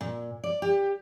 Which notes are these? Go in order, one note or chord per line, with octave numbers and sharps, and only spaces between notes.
A#2
D5
G4